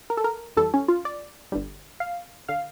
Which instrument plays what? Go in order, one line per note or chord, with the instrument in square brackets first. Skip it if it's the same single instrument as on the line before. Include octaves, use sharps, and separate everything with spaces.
[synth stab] A#4
A4
A#4
F2 E3 G3 A4
C#4
F4
D5
G1 G2 D3 G3
F5
D3 F5